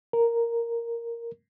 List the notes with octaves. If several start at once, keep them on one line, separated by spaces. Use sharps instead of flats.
A#4